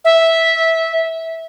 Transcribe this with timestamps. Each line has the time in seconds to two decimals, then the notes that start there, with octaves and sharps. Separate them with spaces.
0.05 E5